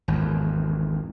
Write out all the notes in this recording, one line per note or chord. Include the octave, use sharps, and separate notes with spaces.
G#1 E2